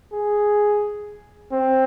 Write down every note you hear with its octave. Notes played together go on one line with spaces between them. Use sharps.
G#4
C4